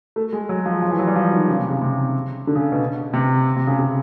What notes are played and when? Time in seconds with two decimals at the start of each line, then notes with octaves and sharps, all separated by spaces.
0.16 A3
0.33 G#3
0.49 F#3
0.66 F3
0.82 F3
0.91 E3
0.99 F#3
1.07 G3
1.16 F3
1.32 D#3
1.48 C#3
1.59 C3
1.70 C#3
1.82 C3
2.47 D3
2.55 C#3
2.72 B2
3.13 C3
3.56 C3
3.67 C#3
3.79 C#3